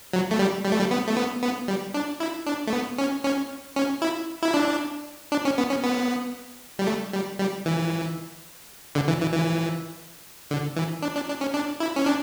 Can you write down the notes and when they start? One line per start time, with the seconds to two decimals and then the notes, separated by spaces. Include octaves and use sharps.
0.13 F#3
0.31 A3
0.39 G3
0.65 G3
0.72 A3
0.79 G3
0.91 B3
1.08 A3
1.17 B3
1.43 B3
1.68 G3
1.94 D4
2.20 E4
2.46 D4
2.67 A3
2.73 B3
2.98 C#4
3.24 C#4
3.76 C#4
4.02 E4
4.43 E4
4.54 D4
5.32 D4
5.45 C#4
5.58 B3
5.70 C#4
5.84 B3
6.79 G3
6.87 A3
7.13 G3
7.39 G3
7.66 E3
8.95 D3
9.08 E3
9.21 E3
9.33 E3
10.51 D3
10.76 E3
11.02 D4
11.15 D4
11.29 D4
11.41 C#4
11.54 D4
11.80 E4
11.96 C#4
12.06 D4